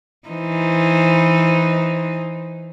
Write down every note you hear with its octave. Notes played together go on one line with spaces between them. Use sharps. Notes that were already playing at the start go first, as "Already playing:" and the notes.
E3 D#4 C5